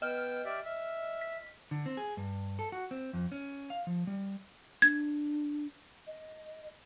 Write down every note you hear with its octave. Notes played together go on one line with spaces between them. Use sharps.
B3 D#5 G5 F6
G4 D5 E5
E5
B6
D3
C4
G#4
G2
A4
F#4
C4
F2
C#4
F5
F3
G3
D4 G#6
D#5